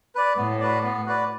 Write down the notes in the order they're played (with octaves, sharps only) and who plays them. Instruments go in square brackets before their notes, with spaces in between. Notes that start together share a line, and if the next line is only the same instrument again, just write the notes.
[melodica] B4 D5
[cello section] A2 [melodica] B3
[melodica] F#4 B4 D5
B3
F#4 B4 D5